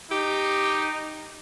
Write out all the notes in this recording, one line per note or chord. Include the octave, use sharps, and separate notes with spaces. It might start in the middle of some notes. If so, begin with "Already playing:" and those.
D#4 G4